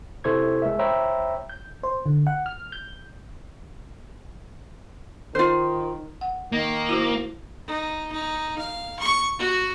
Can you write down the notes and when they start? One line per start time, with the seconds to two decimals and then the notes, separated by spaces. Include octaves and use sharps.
0.24 C3 E4 A4 C5 C#6 G#6
0.62 G#3 A#4 E5
0.79 C5 C#5 E5 G5 A#5 B5
1.49 G6
1.83 C5
2.06 D3
2.27 F#5
2.46 F6
2.72 G6
5.35 D#3 F4 C5
6.21 F#5
6.52 D#3 A#3
6.89 E4 F#4 C5
7.67 D#4
8.12 D#4
8.58 F5
8.99 C#6
9.39 F#4